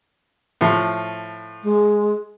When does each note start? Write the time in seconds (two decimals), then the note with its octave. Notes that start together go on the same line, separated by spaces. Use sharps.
0.61 A2 F3
1.64 G#3